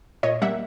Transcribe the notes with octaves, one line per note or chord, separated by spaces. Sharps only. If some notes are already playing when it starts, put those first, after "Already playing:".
A#2 C#5 D#5
G3 A#3 E5 F#5